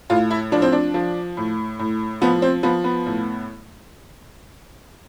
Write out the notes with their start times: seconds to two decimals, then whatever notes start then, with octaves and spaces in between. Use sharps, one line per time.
0.10 A2 F4
0.30 E4
0.52 F3 D4
0.62 C4
0.72 D4
0.94 F3
1.37 A2
1.79 A2
2.22 F3 B3
2.42 C4
2.63 F3 B3
2.84 B3
3.06 A2